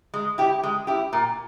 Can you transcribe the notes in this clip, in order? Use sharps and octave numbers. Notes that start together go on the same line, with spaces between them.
G#3
E4 G4
G#3
E4 G4
A#2